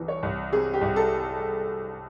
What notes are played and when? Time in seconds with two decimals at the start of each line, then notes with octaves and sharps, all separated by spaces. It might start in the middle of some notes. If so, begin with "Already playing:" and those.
Already playing: C2 E3
0.08 C#5
0.23 C2
0.52 C3 G#4
0.74 G4
0.81 C2
0.96 A4